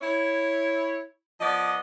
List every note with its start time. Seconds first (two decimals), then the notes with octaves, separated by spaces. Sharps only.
0.02 E4 C#5
1.41 F3 B3 D5 D#5